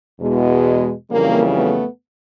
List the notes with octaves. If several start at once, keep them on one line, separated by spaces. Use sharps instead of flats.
E2 B2 G#3
F2 C#3 E3 G3 A#3
A3 B3